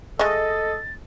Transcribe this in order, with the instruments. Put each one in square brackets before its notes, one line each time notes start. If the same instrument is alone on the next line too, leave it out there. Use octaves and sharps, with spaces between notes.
[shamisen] G#3 A3 [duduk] A4 [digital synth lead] D#5 [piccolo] A6